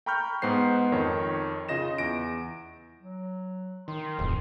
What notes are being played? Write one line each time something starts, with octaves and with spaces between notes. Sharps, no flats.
G5 A#5 B5 C#6 F6 G6
G#2 B3 C5 C7
F2 D#3 C#5
C#3 F4 D#5 A#6 E7
E2 A#6 D7
F#3
D#3 C6
D1 F2